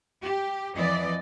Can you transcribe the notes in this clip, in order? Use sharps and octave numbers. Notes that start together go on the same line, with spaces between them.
G4
F2 E3 D5 D#5